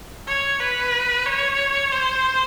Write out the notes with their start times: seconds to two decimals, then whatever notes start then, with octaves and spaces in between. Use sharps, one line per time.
0.27 C#5
0.60 B4
1.26 C#5
1.92 C5